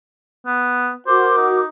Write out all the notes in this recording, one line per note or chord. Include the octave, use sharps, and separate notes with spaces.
B3
F#4 A#4 C5 D6
D#4